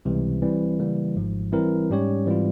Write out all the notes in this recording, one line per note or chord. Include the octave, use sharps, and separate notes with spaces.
C#2 C3 E3 G3
E3 G3 C4
C#3 E3 G3 A#3
G#1 G#2 F3
E3 G3 C4 E4 A#4
G#2 G3 C#4 G4 C#5
G#2 E3 G3 C4 F4